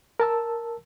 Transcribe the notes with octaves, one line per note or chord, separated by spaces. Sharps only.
A#4 A5 E6